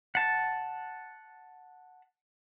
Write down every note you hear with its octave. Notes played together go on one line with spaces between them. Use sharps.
F#5 A5